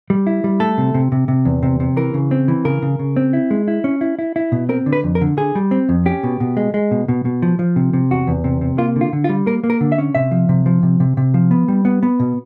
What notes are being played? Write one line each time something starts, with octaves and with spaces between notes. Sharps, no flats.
G3
E4
G3
A3 A4
C3
C3
C3
C3
E2
C3
C3
E3 A#4
C#3
C4
E3
C#3 A#4
C#3
C#3
C4
E4
G#3
E4
C#4
E4
E4
E4
B2
C4 A#4
D3
B4
F2
A#4
D3
D3 G#4
G3
C4
F2
C#4 G4
B2
B2
G#3
G#3
B2
B2
B2
F3
F3
C3
C3
E2 F#4
E2
C3
C3
A#3 F4
D3
F4
D3
F4
G3
A#3 A#4
A#3
A#4
D3
E5
C#4
C3 E5
F3
C3
F3
C3
C3
C3
F3
B3
G3
B3
B3
B2